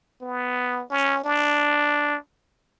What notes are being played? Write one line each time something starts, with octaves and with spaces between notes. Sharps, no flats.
B3
C#4
D4